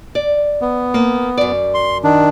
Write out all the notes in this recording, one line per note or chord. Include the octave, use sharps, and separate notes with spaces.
D5
B3
A#3
F#2 D5
C6
D#3 D4